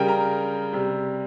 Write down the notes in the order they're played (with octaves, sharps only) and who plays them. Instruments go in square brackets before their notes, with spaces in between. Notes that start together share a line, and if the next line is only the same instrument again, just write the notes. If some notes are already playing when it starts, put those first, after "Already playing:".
Already playing: [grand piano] C#3 G3 A#4 G5
A#5
C3 G3